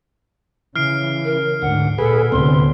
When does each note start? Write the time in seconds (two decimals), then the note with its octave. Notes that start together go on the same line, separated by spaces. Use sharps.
0.76 C#3 E3 F6 C7 D7
1.25 A#4
1.62 D2 G#2 F#5
1.98 A#2 G#4 A4 B4
2.32 D2 A2 C3 B3 C6